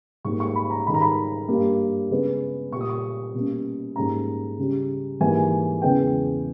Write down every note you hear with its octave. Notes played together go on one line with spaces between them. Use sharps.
G#2 G3 A#3 C#6
C#6
B5
A#5
G#2 D#3 G3 B5
A#5
B5
G2 G3 A#3
C#3 G#3 B3
A#2 G3 A#3 C#6
D#6
C#6
B2 G3 A#3 C#4
G#2 G3 A#3 C#4 A#5
C#3 G3 C#4
G#2 E3 G3 A#3 G#5
E2 C#3 G#3 B3 G5